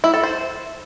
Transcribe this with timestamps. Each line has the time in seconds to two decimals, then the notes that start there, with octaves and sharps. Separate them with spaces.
0.04 E4
0.14 A4
0.24 C5